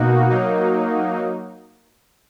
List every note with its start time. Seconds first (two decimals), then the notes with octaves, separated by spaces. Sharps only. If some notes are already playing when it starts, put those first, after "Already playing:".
Already playing: B2 A#3 D#4 F#4
0.30 F#3 A#3 D#4